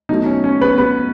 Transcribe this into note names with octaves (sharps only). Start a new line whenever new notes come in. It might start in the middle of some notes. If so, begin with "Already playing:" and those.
B2 F#3 A3 D#4
C#4
C#4
B3 B4
B3 B4